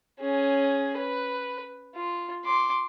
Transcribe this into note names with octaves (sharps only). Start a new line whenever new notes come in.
C#4 G#4
B4
F4
C6 D6